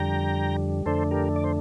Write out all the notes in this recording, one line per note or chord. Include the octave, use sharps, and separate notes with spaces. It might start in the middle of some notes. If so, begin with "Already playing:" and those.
Already playing: F2 D3 G3 G5 A#5
F2 D3 A3 D4 A4 C5
G4 A#4
D5
C5